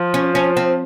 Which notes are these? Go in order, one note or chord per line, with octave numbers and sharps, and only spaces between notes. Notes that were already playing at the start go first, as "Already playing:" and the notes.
Already playing: F3
C#4
C#4
C4